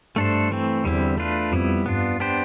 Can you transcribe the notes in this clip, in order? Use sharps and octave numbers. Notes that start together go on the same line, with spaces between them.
G2 A3 D4 A4 C5
E3 A3 C4
E2 D3 G3 C4 E4
A3 D4 F4 B4
F2 G3 B3 E4
G2 B3 D4 F4
B3 D4 G4 C5